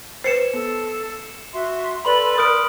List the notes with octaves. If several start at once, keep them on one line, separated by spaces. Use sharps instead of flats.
B4 C5 C7 C#7 E7
B3 A4
F#4 E5 C6
A4 B4 D5 B5 C6 F#7
A#4 B4 D5 D#6 F6 D7